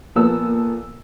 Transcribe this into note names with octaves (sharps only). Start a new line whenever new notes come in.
A#2 F3 B3 A4 A#4 E6